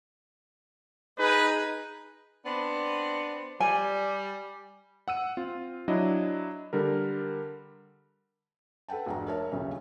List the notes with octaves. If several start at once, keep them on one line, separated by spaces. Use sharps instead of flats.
D#4 G#4 B4
B3 C4 D4
G3 G#5
F#5 E6 D#7
C4 F4
F#3 D4 E4 D#5
D3 G3 A#4
A4 B4 F#5 G5 A5
F1 G#2 D4 F#4 A#5
A#4 C#5 E5 A5
D#1 B1 G2 C#3 C#4 E5